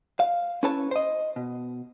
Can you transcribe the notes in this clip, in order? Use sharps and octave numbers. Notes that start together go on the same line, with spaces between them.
F5
C#4 E4 A4 B4 C#5 A5
C5 D#5
B2